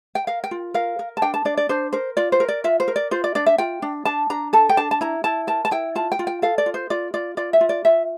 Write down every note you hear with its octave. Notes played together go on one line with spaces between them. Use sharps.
G5
A#4 F5
G5
F4
A#4 F5
A#4
A5
D4 G5
A5
D4 D5
D5
D4 C5
A#4 C5
F4 D5
C5
A#4
D5
F4 E5
C5
A#4
D5
F4 C5
D5
D4 D5
E5
F4 G5
D4
D4 A5
D4 A#5
A4 A5
G5
D4 A5
A5
E4 A#5
E4 A5
A#4 A5
A5
E4 G5
F4 A5
G5
F4
G5
A4 F5
D5
F4
C5
F4 D5
F4 D5
F4 D5
E5
F4
D5
F4 E5